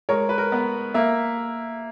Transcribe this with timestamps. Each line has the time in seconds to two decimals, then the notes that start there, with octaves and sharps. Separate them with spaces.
0.09 G#3 A#4 C#5
0.29 B4
0.38 A#4
0.52 B3
0.94 A#3 E5